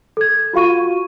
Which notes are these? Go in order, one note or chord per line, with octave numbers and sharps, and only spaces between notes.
A4 G#6
F4 F#4 F5 C#6 D#7